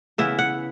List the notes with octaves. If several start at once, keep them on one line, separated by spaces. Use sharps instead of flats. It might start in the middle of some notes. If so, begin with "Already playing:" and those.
C#3 E3 B3 E4 E5
F#5